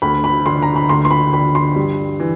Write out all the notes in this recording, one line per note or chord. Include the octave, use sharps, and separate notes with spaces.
D2 B5
B5
D3 C6
A#5
B5
D2 C6
C6
B5
D3 B5
C6
G2
E3